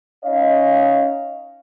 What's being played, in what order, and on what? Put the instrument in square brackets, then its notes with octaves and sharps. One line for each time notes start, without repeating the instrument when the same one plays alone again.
[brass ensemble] C#4 D#4 C#5 D#5 F5